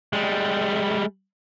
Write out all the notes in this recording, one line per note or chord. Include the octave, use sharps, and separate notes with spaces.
G3 G#3